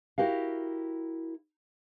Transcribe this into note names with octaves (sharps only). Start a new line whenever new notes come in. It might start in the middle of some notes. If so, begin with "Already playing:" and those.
E4 F#4 G4 A#4 F5